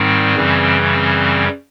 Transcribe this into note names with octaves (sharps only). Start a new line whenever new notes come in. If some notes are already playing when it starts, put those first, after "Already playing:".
Already playing: G#2 D#3 G3 C4
F#2 C#3 E3 G3
C4